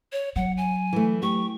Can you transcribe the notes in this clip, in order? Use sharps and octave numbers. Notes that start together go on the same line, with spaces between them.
C#5
F#3 F#5
G#5
E3 A3
G4 C#6